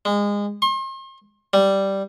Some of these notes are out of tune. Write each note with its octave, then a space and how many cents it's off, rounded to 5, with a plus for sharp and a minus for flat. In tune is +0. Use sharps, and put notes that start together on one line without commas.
G#3 -25
C6 +40
G3 -5